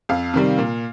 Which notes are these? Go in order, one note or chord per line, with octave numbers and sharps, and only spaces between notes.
F2 F5
C3 D#3 G3
A#2